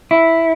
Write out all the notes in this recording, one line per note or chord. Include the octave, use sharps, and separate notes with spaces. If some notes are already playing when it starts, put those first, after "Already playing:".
E4